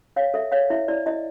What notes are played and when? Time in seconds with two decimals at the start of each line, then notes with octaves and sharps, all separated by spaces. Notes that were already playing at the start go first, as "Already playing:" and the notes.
0.16 C#5 F5
0.34 A4 E5
0.52 C#5 F5
0.70 E4 E5
0.88 E4 D5
1.06 E4 D#5